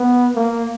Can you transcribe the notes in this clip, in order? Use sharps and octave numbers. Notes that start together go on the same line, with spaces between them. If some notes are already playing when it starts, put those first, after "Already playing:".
Already playing: B3
A#3